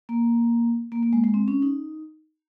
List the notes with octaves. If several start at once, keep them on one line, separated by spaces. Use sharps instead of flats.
A#3
A#3
A#3
G#3
G#3
C4
C#4
D#4